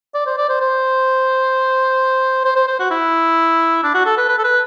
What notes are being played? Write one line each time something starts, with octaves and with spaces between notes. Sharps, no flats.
D5
C5
D5
C5
C5
C5
C5
C5
F#4
E4
D4
F#4
A4
B4
B4
A4
B4